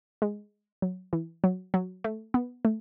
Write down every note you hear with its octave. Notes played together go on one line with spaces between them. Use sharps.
G#3
F#3
E3
F#3
F#3
A3
B3
A3